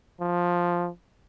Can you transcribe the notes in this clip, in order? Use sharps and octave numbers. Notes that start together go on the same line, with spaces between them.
F3